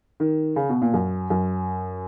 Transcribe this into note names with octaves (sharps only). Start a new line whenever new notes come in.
D#3
C#3
B2
A#2
F#2
F#2